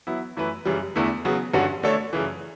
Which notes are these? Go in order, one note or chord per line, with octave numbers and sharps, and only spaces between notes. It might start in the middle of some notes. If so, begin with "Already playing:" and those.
F#3 B3 E4
F#2 E3 A3 E4 B4
F#2 C#3 E3 G3
E2 D3 A3 E4
C#3 F#3 B3
G2 D3 G3 C#4 F#4
D3 A3 D4 A4 C#5
F#2 C#3 E3